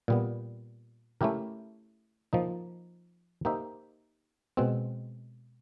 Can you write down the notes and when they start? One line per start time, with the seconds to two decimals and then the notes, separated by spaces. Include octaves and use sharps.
0.08 A#2 G3 B3
1.21 A3 C#4 E4 G4 A#4
2.33 F3 A#3 D#4
3.45 A#3 D#4 G4 C5 E5
4.57 B2 G#3 C4